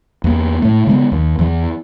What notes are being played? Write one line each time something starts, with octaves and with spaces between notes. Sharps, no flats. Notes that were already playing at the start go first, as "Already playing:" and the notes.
E2 A#3
A2 A3
C#3 G#3 B3
D#2
E2 E3